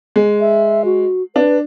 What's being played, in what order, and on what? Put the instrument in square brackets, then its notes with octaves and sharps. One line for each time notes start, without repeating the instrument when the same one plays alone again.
[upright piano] G#3
[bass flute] E5
F#4
[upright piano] D4 [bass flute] B4